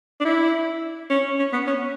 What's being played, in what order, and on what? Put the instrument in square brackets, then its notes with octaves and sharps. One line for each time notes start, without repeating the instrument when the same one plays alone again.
[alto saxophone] D4
E4
C#4
C#4
B3
C#4